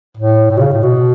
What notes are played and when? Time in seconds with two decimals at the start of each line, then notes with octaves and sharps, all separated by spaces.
0.17 A2
0.50 A2
0.56 B2
0.60 C#3
0.72 A2
0.83 B2